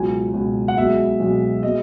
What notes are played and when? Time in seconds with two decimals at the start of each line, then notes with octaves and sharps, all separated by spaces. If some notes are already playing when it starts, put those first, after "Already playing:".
Already playing: C#2 B2 F#3 G#5
0.34 C#2 B2 F#3
0.68 F#5
0.77 B1 B2 G#3 E5
1.20 B1 B2 G#3
1.63 B2 G#3 D#5